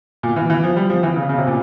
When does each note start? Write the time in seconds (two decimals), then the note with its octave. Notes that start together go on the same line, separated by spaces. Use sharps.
0.23 A#2
0.36 E3
0.50 E3
0.64 F3
0.77 G3
0.90 F3
1.03 E3
1.16 C#3
1.29 C#3
1.38 C3
1.47 A#2